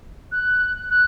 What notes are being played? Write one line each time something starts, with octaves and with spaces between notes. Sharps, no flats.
F#6
F#6